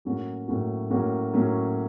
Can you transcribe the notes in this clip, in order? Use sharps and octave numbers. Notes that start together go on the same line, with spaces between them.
A2 F#3 A#3 C#4 F#4
A2 F#3 A#3 C#4 F#4
A2 F#3 A#3 C#4 F#4
A2 F#3 A#3 C#4 F#4